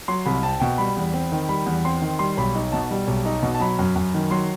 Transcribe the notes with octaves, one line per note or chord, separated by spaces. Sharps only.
F#3 C6
C2 B5
C4 A5
B2 G5
G3 B5
E2
C4
D#3
G3 B5
E2
C4 C6
D#3
G3 C6
B1 B5
D#4
B2 A5
G3
B1
D#4
B2
A5
F#3 B5
F#2
F#2
D#3
F#3 C6